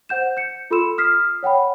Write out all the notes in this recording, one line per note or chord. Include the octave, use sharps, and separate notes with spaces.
C5 F#5 G6 E7
G6 C#7
F4 A4 B5 C6 E6 E7
D#6 F6 B6 C7
C#5 F#5 G5 B5